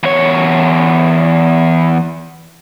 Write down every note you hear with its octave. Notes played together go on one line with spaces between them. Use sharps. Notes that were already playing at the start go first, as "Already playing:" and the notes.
E2 C#5